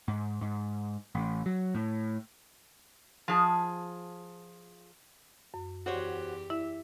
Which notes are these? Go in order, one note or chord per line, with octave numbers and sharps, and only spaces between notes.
G#2
G#2
A1
F#3
A2
F3 G#4 A5
F#2
E2 F#4 G4 C5 C#5
E4 E5